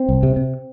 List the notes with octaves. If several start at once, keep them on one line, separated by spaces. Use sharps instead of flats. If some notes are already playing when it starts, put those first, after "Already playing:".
Already playing: C4
C2
C3
C3